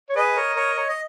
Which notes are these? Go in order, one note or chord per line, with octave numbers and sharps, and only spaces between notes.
C#5
G#4 B4 D#5
A#4 C#5
A#4 C#5
C#5
D#5